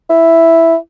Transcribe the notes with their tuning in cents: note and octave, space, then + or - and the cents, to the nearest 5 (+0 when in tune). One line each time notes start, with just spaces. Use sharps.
E4 +0